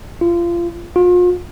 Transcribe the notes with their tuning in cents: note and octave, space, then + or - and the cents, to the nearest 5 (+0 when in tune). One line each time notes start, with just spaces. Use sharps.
F4 -25
F4 +40